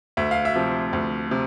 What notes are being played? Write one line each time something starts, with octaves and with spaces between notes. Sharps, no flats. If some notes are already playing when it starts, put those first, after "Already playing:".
D2 E5
F5
E5
C3 F3
D2
C3